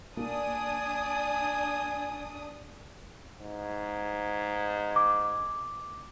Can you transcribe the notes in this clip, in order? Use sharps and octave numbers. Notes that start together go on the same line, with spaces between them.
A#3 D4 G#5 D#6
G#2
D6